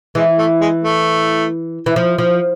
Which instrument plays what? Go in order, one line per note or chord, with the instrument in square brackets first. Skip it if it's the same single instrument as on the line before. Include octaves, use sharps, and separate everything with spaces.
[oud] E3 [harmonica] G#3
[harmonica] A3
G#3
A3
[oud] E3
F3
F3